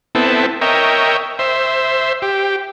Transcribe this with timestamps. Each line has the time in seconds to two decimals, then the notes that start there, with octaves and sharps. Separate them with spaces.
0.15 B3 C4 E4 A4
0.61 A#4 C#5 D#5 E5 G5
1.39 C5 E5
2.22 G4